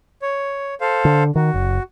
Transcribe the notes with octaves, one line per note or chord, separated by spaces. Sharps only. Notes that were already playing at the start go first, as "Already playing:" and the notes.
C#5
A4 C5 F5
D3
D#3 F#4
F#1